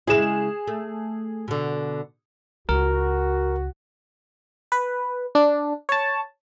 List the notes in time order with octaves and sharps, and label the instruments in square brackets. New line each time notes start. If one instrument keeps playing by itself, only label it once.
[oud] C#3 G#3 E4 [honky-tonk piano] G#4 E7
[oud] A3
B2 D3
[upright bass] C#2 [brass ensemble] F#4 [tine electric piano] A#4
[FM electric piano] B4
D4
C#5 A5